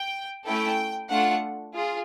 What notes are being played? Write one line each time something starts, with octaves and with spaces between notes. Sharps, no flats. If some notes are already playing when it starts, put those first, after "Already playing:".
Already playing: G5
A3 C#4 E4 A4 G5
A3 D4 F4 F#5
F4 G#4